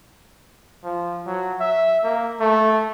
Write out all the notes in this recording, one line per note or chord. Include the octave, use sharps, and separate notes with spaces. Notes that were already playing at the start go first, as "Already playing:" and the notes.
F3
F#3
E5
A#3
A3